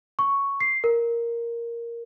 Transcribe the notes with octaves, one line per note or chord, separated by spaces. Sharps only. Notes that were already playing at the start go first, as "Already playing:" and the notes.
C#6
C7
A#4